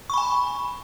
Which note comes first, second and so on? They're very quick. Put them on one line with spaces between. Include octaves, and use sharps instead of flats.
C#6 B5 G#5